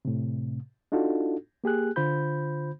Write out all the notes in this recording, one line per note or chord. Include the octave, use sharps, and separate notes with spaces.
A2 C3
D4 D#4 F4 F#4 A4
A#3 G4 G#4 F#6
D3 F4 C5 B5 G6